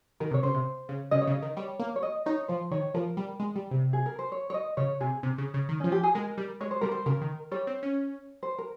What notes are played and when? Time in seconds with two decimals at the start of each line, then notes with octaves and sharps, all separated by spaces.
0.20 D#3 A#4
0.31 C3
0.34 C#5
0.43 C#3 C5
0.54 C3
0.89 C#3
1.11 C#3 D#5
1.22 C#5
1.27 C#3
1.32 D#5
1.42 D#3
1.57 G3 C#5
1.79 A#3
1.96 C#5
2.03 D#5
2.26 D#4 C#5
2.48 F3 C5
2.71 D#3 C#5
2.94 F3 A#4
3.17 G3
3.40 G#3
3.56 G3
3.71 C3
3.93 G#4
4.06 A#4
4.19 C5
4.32 C#5
4.50 C#5
4.54 D#5
4.77 C#3 C#5
5.00 C3 G#4
5.23 C3
5.38 C#3
5.54 C#3
5.69 D#3
5.80 C#4
5.84 F3
5.92 G4
6.03 G#4
6.14 G#3 A#4
6.38 G3
6.61 G#3 C#5
6.71 C5
6.81 G3 A#4
6.92 C5
7.06 C#3 A#4
7.21 D#3
7.52 G3 C#5
7.67 C4
7.83 C#4
8.43 C5
8.58 A#4